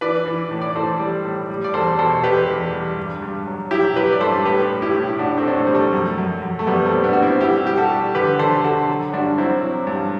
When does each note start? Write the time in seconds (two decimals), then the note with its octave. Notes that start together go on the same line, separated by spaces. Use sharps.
0.01 E3 B4 D5
0.26 E3
0.51 A2
0.61 D5
0.75 E3 A4 C5
1.00 G3
1.25 A2
1.50 G3
1.64 D5
1.74 E2 A4 C5
1.99 B2 A4 C5
2.23 E2 G4 B4
2.48 E2
2.73 G3
2.97 G2
3.22 G2
3.47 F#3
3.71 F#3 E4 G4
3.96 F#3 G4 B4
4.12 D5
4.21 G2 A4 C5
4.45 A2 G4 B4
4.70 G3
4.82 E4 G4
4.94 A2
5.19 A2 D4 F#4
5.37 A3 C4
5.44 A2 D4
5.56 A3 C4
5.67 G3
5.75 A3
5.93 F#2
6.18 F#2
6.42 F#2
6.59 A3
6.67 F#2 G3 B3
6.85 A3 C4
6.91 G3
7.04 B3 D4
7.13 G3 F#4
7.22 C4 E4
7.41 G3 E4 G4
7.56 F#4
7.65 G3 G4
7.78 F#4 A4
7.90 G3
8.15 D3 G4 B4
8.39 D3 A4 C5
8.64 D3 F#4 A4
8.88 F#3
9.13 G2 D4 F#4
9.38 F#3 C4 E4
9.62 F#3
9.87 G2